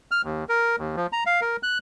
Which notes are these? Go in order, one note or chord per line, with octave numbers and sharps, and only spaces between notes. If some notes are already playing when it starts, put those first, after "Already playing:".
F6
D#2
A#4
D#2
F3
A#5
F5
A#4
F#6